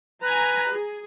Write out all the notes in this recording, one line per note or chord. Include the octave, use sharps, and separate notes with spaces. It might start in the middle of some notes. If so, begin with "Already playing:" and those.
B4 G#5 A#5
G#4